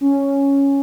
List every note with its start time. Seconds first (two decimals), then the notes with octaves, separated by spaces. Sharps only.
0.01 C#4